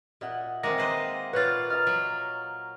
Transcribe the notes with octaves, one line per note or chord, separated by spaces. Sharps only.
A#2 D#5 E5 F#5
D#3 G#3 A#3 C4 A#6
B4 C5 D#5
A#2 F4 B4 C#5 F#6 A6
D#5 F5 A#5 F6
F#3